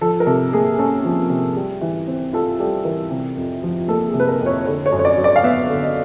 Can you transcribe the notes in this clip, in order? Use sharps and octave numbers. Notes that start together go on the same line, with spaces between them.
F3 A4
A#4
C3 A4
A#3 G#4
C#4 A4
F3
C3
G3
E3
C4
F4 A4
G3 A4
E3 A#4
C3
F2
F3
A#3 A4
G#4
C3
B4
A#4
F2
C#5
D3 C#5
C#5
F#2
C#5
D5
F#3
D5
F5
B3 E5
D3
D#5